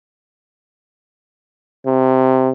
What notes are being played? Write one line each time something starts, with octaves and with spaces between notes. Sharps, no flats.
C3